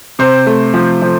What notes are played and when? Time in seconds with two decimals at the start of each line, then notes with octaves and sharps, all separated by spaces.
0.19 C3 C5
0.46 A3
0.74 F3
1.02 F3